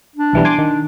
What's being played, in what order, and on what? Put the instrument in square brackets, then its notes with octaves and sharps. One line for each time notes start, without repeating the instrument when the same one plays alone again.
[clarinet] D4
[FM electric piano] B1 E3 G3
G#5 C6 D6
D#3